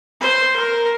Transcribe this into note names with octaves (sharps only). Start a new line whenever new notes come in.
C5
A#4